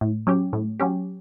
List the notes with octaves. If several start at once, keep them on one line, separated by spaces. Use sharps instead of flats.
A2
F#3 C#4 G4
A2
F#3 C#4 G4